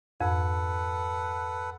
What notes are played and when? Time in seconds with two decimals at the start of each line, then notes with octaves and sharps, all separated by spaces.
0.21 F2 G#2 A4 B4 F#5